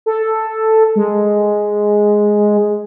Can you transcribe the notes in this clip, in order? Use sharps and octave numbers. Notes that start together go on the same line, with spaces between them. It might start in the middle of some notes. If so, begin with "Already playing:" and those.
A4
G#3